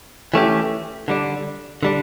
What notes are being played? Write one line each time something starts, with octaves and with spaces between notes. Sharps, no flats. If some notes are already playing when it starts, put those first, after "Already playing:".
E3 A3 C#4 G4
D3 G3 D4
D3 G3 D4